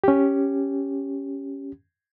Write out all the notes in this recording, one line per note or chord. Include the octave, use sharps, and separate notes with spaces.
C#4 G4